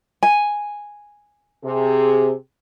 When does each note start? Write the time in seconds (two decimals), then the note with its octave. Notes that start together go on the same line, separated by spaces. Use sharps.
0.23 G#5
1.64 C3 G#4